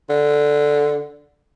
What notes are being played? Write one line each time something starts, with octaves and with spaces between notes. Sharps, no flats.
D3